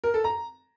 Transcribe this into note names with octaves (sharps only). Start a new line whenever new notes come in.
A#4
A4
A#5